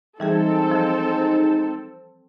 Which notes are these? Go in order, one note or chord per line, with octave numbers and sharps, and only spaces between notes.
E3 G3 G#3 C4 D#4 G#4 A4
F3